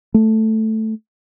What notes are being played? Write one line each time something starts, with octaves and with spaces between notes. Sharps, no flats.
A3